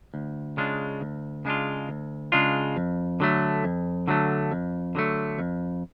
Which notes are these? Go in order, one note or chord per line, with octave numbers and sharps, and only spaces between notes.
D2
C#3 G#3 D4 F4
D2
C#3 G#3 D4 F4
D2
C#3 G#3 D4 F4
F2
D3 F#3 A3
F2
D3 F#3 A3
F2
D3 F#3 A3
F2